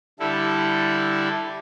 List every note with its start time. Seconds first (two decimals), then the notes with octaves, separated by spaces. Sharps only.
0.19 D3 G3 E4 A4